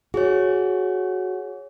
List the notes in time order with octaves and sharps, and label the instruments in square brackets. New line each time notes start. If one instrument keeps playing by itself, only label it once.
[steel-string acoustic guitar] F#4 [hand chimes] G#4 C#5